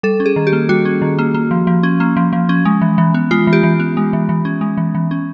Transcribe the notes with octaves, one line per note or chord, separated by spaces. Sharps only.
G3 A4
C#4
G#4
D#3
G4
A#3
G3 F#4
C#4
D#3
A#3
A#3
F3
F3
C#4
A#3
F3
F3
C#4
G#3
E3
E3
B3
G#3 F4
E3
G4
E3
B3
G#3
E3
E3
C#4
G#3
E3
E3
C#4